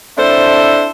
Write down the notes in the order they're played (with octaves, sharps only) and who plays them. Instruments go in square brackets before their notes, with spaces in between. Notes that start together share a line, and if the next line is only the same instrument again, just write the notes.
[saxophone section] C4 D4 E4 A4 C5